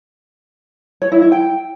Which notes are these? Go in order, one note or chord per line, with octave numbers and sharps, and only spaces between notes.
C#5
E4
E4
G5